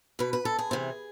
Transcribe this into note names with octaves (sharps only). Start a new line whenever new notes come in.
B2 B4
B4
A4
G#4
C3 E3